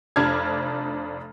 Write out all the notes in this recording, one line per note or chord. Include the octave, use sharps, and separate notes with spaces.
F1 F2 D4 A5 F6 G#6